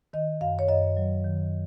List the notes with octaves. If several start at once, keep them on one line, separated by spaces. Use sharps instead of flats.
D#3 D#5
F#2 F5
C#5
F#2 D#5
F#3
D#3